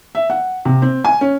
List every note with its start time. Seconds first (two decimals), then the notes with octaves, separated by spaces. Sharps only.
0.15 E5
0.30 F#5
0.65 C3
0.82 C4
1.05 G#5
1.21 C#4